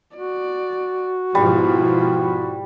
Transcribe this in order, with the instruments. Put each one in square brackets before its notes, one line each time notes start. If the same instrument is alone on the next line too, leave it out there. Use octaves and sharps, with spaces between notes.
[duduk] F#4 [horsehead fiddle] D5
[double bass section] G#2 B2 F3 [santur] G3 [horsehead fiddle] E4